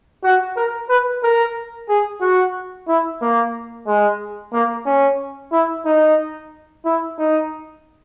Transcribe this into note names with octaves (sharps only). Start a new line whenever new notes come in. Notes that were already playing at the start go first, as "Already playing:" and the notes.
F#4
A#4
B4
A#4
G#4
F#4
E4
A#3
G#3
A#3
C#4
E4
D#4
E4
D#4